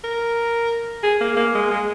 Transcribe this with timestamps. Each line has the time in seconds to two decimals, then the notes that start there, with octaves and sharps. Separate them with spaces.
0.04 A#4
1.03 G#4
1.20 A#3
1.37 A#3
1.54 G#3
1.71 G#3